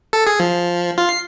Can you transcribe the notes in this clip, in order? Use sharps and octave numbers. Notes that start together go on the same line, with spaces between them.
A4
G#4
F3
F4
C7